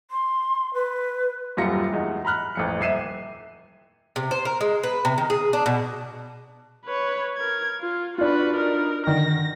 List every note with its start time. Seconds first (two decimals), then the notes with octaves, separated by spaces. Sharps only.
0.11 C6
0.74 B4
1.57 D#1 F#2 G3 F4 A#6 C#7
1.92 E2 G#3 D#4
2.25 A#5 B5 F6 F#6
2.55 A1 F2 C#7
2.80 D#1 E5 C7 D#7 E7
4.16 C3
4.31 C5
4.45 A#4
4.61 G#3
4.83 B4
5.05 C3
5.18 D#3
5.30 G#4
5.53 D4
5.66 B2
6.85 B4 C#5
7.37 A#4 G#6
7.81 F4
8.18 D4 F4 F#4 B4
8.55 D#4 A#4
9.07 D3 D#3 A#6